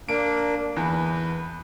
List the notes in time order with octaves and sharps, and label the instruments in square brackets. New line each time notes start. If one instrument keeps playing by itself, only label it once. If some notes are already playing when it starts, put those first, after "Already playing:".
[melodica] A#3 D4 [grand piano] D7
[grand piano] E2 [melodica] B4